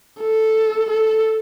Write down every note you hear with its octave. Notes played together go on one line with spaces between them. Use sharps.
A4
A4